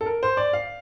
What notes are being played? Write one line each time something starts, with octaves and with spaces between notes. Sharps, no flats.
A4
A#4
C5
D5
F5